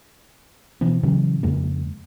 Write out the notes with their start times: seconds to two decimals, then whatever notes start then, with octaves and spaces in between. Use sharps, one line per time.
0.81 B2 E3 B3 C4
1.03 A#2 C#3 E3 F#3
1.43 F2 C#3 G#3 A#3